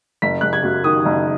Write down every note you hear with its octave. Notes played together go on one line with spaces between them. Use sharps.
F#1 B6
F#1 F#6
G#6
F#2
D#3 D#6
F#1